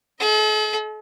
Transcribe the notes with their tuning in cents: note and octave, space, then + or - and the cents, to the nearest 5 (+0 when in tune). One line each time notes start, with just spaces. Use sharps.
A4 -45 D#5 +35